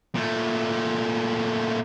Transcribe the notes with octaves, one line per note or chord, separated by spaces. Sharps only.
A#2 A3